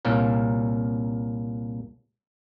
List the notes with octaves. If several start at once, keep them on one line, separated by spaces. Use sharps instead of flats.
C2 A#2 A#3 C#4 A#4